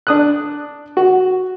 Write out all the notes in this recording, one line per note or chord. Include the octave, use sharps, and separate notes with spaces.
D4 D#6 F#6
F#4